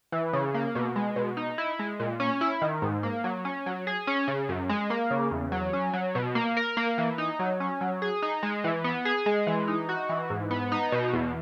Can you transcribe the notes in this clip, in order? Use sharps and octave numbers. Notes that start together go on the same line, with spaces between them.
E3
C#3
A#3
B2
G#3
B2
D#4
E4
G#3
A#2
C#4
E4
D#3
G#2
A#3
F#3
C#4
F#3
G#4
C#4
C#3
F#2
G#3
A#3
C#3
E2
F#3
C#4
F#3
B2
A#3
A#4
A#3
E3
D#4
F#3
C#4
F#3
G#4
D#4
G#3
E3
B3
G#4
G#3
E3
D#4
F#4
E3
G#2
B3
D#4
B2
E2